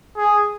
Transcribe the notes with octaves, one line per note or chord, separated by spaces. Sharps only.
G#4